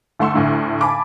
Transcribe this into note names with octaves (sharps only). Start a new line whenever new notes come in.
D2 A3 F#5 C6 C#6 E6
D2 A2 D3
G#5 A5 B5 D6